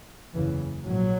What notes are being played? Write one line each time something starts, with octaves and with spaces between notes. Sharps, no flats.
F#1 E2 C#3 E3
A#1 G#2 F#3